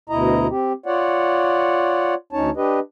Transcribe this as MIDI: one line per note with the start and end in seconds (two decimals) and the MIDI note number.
0.09 0.47 38
0.09 0.47 47
0.09 0.47 64
0.09 0.47 75
0.09 0.47 82
0.50 0.73 60
0.50 0.73 67
0.86 2.14 65
0.86 2.14 73
0.86 2.14 74
0.86 2.14 78
2.33 2.50 38
2.33 2.50 61
2.33 2.50 63
2.33 2.50 73
2.33 2.50 81
2.56 2.80 62
2.56 2.80 67
2.56 2.80 71
2.56 2.80 75